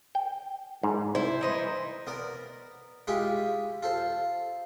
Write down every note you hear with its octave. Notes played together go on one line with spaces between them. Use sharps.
G5
G#2
C2 E4 C5
E3 D#4 C5
B3 A#4 D5
G#3 E4 F4 G4
F4 A4 C5